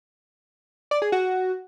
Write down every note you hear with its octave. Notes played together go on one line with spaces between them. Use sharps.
D5
G#4
F#4